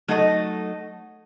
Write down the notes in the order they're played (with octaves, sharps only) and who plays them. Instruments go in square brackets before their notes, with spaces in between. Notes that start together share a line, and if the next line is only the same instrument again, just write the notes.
[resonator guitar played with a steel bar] F#3 A3 D#4 A4 D#5